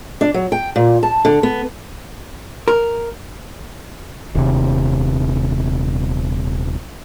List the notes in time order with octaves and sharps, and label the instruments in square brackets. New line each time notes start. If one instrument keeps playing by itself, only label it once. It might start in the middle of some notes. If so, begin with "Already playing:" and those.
[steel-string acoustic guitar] D4
F#3
G5
A#2
A5
D3
B3
[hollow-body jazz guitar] A#4
[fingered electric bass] D#1 C3